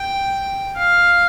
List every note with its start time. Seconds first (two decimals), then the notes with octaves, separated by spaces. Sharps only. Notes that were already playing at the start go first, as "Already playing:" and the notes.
Already playing: G5
0.77 F5